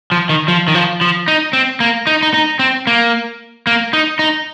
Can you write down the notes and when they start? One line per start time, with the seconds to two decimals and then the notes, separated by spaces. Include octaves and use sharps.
0.12 F3
0.29 D#3
0.48 F3
0.68 D#3
0.75 F3
1.01 F3
1.28 D#4
1.53 C4
1.80 A#3
2.07 D#4
2.23 D#4
2.34 D#4
2.59 C4
2.87 A#3
3.67 A#3
3.93 D#4
4.19 D#4